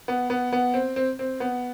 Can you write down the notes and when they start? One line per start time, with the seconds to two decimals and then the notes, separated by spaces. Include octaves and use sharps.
0.08 B3
0.30 B3
0.53 B3
0.74 C4
0.96 C4
1.19 C4
1.40 B3